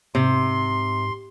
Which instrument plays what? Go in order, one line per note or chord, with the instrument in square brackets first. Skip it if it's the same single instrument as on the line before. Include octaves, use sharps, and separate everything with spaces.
[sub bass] G#2 [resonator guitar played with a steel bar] C3 [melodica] C6